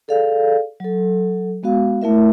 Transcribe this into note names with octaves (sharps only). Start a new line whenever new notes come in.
G#4 A4 D5 F5
F#3 A4
G#3 B3 F#4 F5
A3 E4 A#4 E5